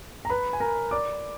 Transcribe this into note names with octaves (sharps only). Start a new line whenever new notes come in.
A#5
B4 B5
G#5
A#4 A#5
D5 D6